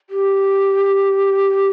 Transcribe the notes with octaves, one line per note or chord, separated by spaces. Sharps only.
G4